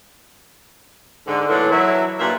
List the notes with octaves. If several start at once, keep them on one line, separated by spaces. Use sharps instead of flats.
G#2 D3
A2 D3 E3 F#3 A#3
F#3 E4
G2 A#2 A#3 B4 E5